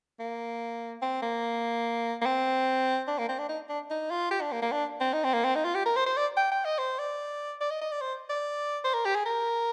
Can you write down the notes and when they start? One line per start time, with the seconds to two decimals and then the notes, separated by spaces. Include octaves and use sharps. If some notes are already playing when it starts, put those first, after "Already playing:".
0.20 A#3
1.02 C4
1.22 A#3
2.22 A#3
2.26 C4
3.08 D4
3.18 A#3
3.29 C4
3.39 D4
3.49 D#4
3.70 D4
3.91 D#4
4.11 F4
4.31 G4
4.41 D4
4.52 A#3
4.62 A#3
4.72 D4
5.00 C4
5.13 D#4
5.24 C4
5.34 A#3
5.45 C4
5.55 D#4
5.65 F4
5.75 G4
5.86 A#4
5.96 C5
6.06 C5
6.17 D5
6.37 G5
6.52 G5
6.65 D#5
6.78 C5
6.99 D5
7.61 D5
7.70 D#5
7.82 D#5
7.92 D5
8.01 C5
8.29 D5
8.84 C5
8.94 A#4
9.05 G4
9.15 G#4
9.26 A#4